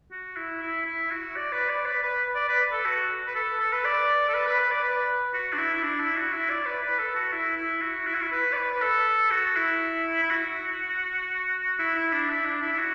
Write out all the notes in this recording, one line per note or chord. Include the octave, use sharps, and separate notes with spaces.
F#4
E4
E4
E4
F#4
D5
B4
D5
B4
B4
D5
B4
A4
F#4
B4
A4
A4
B4
D5
A4
B4
B4
B4
D5
B4
F#4
D4
E4
E4
D4
E4
F#4
E4
D5
B4
B4
A4
F#4
E4
E4
F#4
E4
F#4
E4
B4
D5
B4
A4
F#4
E4
E4
F#4
E4
E4
D4
E4
D4
E4
E4
F#4